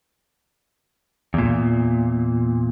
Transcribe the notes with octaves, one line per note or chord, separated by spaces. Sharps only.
E2 A#2